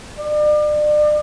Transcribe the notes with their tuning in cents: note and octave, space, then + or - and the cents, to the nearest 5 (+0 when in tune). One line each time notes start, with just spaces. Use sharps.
D5 +35